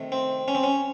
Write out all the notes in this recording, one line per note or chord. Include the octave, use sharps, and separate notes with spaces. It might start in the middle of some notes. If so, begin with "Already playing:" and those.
Already playing: C3 D#3 A3
C4
C#4
C4
C#4